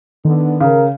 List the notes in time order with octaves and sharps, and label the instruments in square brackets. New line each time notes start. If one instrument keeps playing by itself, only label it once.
[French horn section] D3 B3 [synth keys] D#3
[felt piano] C#3 [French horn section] A#4